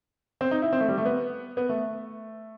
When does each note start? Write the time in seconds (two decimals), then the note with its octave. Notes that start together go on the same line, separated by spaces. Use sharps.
0.41 C4
0.51 D#4
0.62 E4
0.73 C4
0.81 A3
0.88 G3
0.98 A3
1.05 B3
1.57 B3
1.69 A3